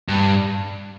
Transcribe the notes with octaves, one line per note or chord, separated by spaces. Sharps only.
G2